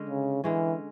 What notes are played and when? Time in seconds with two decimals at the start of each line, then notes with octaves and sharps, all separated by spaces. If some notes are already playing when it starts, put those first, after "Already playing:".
Already playing: D3 G#3 C#4
0.09 C#3
0.44 D3 E3 G#3 C#4